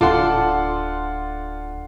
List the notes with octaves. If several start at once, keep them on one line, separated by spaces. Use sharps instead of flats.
D1 D4 F4 A4 F#5 C6